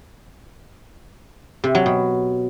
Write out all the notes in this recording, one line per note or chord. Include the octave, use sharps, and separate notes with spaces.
C3
F#3
B2